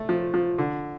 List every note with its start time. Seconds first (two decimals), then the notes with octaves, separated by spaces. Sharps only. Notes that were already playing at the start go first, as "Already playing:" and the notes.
Already playing: A3
0.09 F3
0.34 F3
0.58 D3